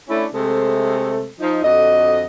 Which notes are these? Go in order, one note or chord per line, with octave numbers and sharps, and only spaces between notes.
A3 C#4 D4 E4
C3 G#3 A3 C4 A4
F3 D#4
F2 D3 F#4 D#5